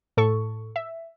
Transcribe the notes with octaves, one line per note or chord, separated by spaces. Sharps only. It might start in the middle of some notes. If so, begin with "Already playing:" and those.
A2 A4 C#6
E5